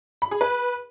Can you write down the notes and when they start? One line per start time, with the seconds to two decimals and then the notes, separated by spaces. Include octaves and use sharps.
0.22 B5
0.31 G#4
0.41 B4